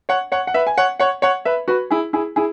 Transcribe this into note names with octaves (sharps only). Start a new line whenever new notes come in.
C#5 F#5
C#5 F#5
F#5
B4 E5
G#5
C#5 F#5
C#5 F#5
C#5 F#5
B4 E5
F#4 B4
E4 G#4
E4 G#4
E4 G#4